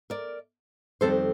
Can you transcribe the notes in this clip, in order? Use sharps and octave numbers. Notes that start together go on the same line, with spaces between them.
A#4 D5
F2 D#3 G3 C4 A4 C5